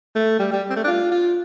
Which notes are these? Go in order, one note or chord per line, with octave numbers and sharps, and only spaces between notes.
A3
G3
G3
C4
A3
D4
F4
F4